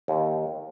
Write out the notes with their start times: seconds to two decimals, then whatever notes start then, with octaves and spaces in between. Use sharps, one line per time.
0.08 D#2